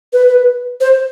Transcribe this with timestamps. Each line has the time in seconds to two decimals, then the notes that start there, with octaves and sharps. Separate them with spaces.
0.13 B4
0.80 C5